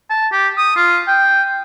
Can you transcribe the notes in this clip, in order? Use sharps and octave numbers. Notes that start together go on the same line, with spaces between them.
A5
G4
D#6
F4
G5